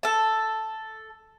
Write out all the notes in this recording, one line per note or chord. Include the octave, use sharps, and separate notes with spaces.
A4 A5